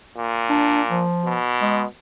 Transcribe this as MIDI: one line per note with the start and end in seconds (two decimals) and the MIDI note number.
0.16 1.03 46
0.50 0.81 62
0.91 1.37 53
1.25 1.85 47
1.62 1.84 56